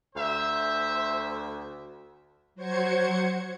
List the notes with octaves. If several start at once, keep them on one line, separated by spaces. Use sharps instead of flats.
D2 C5 E5
F#3 F#4 C5 G#6 C#7